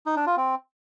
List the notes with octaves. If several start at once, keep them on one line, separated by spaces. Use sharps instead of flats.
D#4
D4
F4
C4